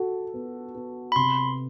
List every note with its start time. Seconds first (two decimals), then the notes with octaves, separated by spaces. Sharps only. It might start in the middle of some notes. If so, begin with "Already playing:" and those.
Already playing: F#4 A4
0.34 B3
0.75 B3
1.12 B5
1.16 C3 C6